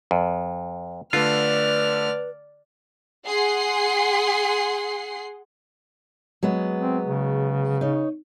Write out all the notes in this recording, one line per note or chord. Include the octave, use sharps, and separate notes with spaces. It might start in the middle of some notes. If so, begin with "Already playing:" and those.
F2
D3 A3 F4 B4 D5 F6
G#4 F#5 C6 C7
F#3 G#3 B3
C4
C#3
D#4 C#5